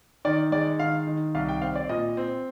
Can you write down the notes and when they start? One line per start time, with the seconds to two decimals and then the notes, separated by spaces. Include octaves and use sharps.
0.25 D#3 D5
0.52 G#3 D5
0.79 D#3 F5
1.07 D#3
1.35 C2 F5
1.49 G5
1.61 C4 F5
1.75 D5
1.89 A#2 D#5
2.17 C4